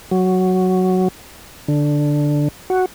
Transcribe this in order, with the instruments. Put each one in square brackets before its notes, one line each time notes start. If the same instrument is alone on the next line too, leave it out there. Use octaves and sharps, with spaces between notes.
[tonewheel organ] F#3
D3
F#4